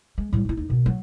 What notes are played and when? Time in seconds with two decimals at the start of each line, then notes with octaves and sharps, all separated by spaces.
0.18 G#3
0.33 A2 G3
0.45 G#2 E4
0.57 D#2 D#4
0.70 B2 D#3
0.86 F#3